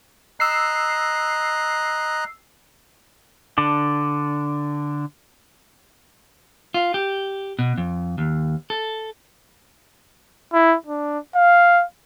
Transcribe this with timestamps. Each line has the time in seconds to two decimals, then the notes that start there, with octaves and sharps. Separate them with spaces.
0.40 D#5 A#5 E6 F#6 C7
3.58 D3 D4
6.74 F4
6.94 G4
7.59 B2
7.78 F2
8.18 D#2
8.70 A4
10.53 E4
10.86 D4
11.35 F5